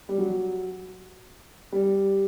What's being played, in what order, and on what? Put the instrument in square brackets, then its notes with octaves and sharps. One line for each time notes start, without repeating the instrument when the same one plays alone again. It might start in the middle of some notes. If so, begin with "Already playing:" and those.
[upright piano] G3
F#3
G3